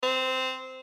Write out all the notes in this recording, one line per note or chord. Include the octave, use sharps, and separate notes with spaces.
C4